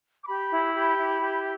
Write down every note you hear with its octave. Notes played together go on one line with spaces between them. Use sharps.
D6
G4 B5
E4
G4 B5
E4
G4